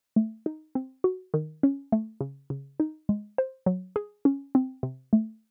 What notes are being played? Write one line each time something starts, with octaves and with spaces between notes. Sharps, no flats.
A3
D#4
C4
F#4
D#3
C#4
A3
C#3
C#3
D#4
G#3
C5
F#3
G#4
C#4
C4
C3
A3